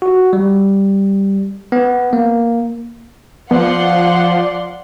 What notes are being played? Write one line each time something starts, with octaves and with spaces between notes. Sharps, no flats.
F#4
G3
B3
A#3
F3 B3 D5 F5 F#5 C6